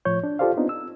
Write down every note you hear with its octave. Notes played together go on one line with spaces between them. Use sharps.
A2 F3 C#5 G6
D4
F4 G4 A4 C5 D5 F5
B3 C4 D4 D#4 F4
E6